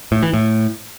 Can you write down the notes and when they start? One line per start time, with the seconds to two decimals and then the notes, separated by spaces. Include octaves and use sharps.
0.12 A2
0.23 E3
0.34 A2